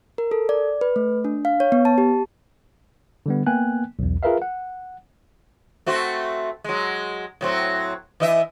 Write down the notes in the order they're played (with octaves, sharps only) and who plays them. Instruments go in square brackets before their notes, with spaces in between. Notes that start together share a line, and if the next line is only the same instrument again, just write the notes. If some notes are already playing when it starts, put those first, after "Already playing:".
[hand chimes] A#4
A4
D5
B4
A3
D4
F5
C#5
B3
A5
G4
[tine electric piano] D3 G3 B3
A#3 B3 G5 G#5 F#6
B1 E2
F4 G#4 A#4 B4 E5 F5
F#5
[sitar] A3 C4 F#4
F#3 G#3
A2 F#3 C4
E3 D#5 E5